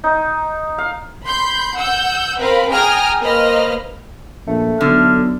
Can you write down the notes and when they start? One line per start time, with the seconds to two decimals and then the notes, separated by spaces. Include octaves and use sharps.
0.04 D#4
0.78 F5
1.24 B5 C6 G6
1.75 F#5 E6 G6
2.39 C4 A#4 B4 F5 B5
2.70 G#4 G5 G#5 A#5 D#6 F6
3.20 A#3 B4 C5 D#5 F6
4.47 A#1 A3
4.81 B1 D3 F6